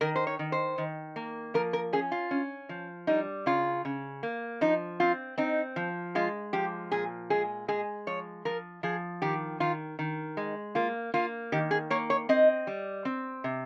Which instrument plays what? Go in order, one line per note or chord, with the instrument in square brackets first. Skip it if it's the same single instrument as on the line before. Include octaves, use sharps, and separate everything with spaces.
[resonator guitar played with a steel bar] D#3 A#4
C5
C#5
D#3
C5
D#3
A#3
F3 A#4
A#4
C#4 G#4
F4
C#4
F3
G3 D#4
C#3 F4
C#3
A#3
F3 D#4
C4 F4
C4 D#4
F3
G#3 F4
F3 G4
A#2 G#4
G#3 G#4
G#3 G#4
F3 C#5
F3 A#4
F3 G#4
D#3 G4
D#3 F4
D#3
G#3
A#3 F4
A#3 F4
D#3 G4
G#4
A#3 C#5
C#5
C4 D#5
G3
C4
C3